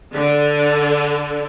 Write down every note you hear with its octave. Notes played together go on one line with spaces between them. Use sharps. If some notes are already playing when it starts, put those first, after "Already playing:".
D3